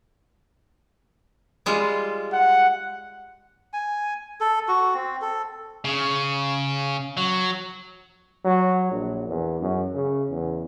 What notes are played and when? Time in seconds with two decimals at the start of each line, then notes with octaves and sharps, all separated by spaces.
1.66 G3 G#3 F4
2.33 F#5
3.73 G#5
4.40 A4
4.68 F#4
4.94 C4
5.22 A4
5.85 C#3
7.17 F#3
8.45 F#3
8.92 A#1
9.28 E2
9.61 F#2
9.94 C#3
10.30 E2